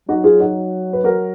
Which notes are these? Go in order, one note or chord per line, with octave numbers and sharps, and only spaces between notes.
F#3 D#4 F#4
F4 G#4
D#4 F#4
B4
F#4 A#4